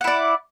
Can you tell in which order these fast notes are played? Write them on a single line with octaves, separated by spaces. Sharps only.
F#5 E4 D5